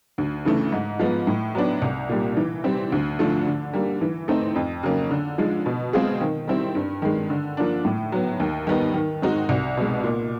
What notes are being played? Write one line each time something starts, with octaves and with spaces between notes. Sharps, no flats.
D2
C#3 E3 A3
G#2
F3 G#3 B3
A2
F#3 B3 D4
C2
A#2 G3
E3
G3 C4
D2
D3 F3 A3
D3
G3 A#3
E3
A3 C4 D#4
F2
C#3 F#3 A#3
D3
F3 G#3
B2
G#3 C4 F4 G#4
D#3
G3 C4 E4
G2
D#3 G#3
D3
F3 A#3 D4
A2
F#3 B3
D#2
D#3 G3 B3 D#4
D#3
G#3 C4 D#4 F#4
C2
B2 G#3
A#2